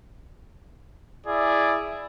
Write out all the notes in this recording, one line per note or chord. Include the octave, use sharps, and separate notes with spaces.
E4 G#4 D5 E5